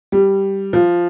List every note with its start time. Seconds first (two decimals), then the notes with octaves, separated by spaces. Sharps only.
0.12 G3
0.73 F3